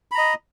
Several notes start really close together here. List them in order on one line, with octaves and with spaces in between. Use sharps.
B5 A#5 D#5